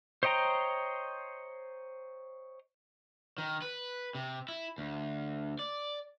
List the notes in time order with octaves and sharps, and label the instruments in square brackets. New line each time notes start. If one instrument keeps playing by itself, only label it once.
[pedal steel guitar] C5 C#5 D#5 G5 A#5
[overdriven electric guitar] D#3
B4
C3
E4
D2
D5